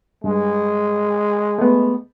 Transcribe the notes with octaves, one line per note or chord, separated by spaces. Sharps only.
G2 G#3
A3 B3